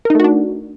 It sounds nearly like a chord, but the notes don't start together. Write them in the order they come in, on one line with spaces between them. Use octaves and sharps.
A#4 D#4 A3 F#4 D4